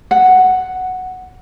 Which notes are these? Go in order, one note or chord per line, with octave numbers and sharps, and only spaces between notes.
F#5